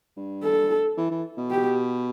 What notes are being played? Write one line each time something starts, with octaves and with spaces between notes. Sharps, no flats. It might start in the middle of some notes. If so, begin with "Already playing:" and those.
G2
A4
E3
E3
B2
G4